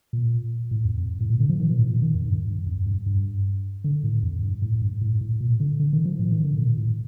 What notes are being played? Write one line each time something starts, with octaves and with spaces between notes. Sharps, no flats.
A#2
A2
F2
F2
A2
A#2
D3
F3
D#3
A#2
A2
A#2
D#3
F2
G2
G2
F2
G2
G2
D3
A2
F2
G2
A2
G2
A2
A2
A#2
D3
D3
D#3
F3
A2
D#3
D3
A#2
A2